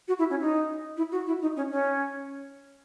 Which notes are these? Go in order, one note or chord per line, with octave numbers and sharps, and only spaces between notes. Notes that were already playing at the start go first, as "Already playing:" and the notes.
F#4
E4
C#4
D#4
E4
F#4
E4
D#4
C#4
C#4